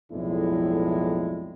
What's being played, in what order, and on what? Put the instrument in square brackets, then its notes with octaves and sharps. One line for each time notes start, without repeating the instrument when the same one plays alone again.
[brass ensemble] B1 F2 A2 G#3 D4 E4